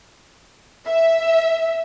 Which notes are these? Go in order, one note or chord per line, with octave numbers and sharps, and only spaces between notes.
E5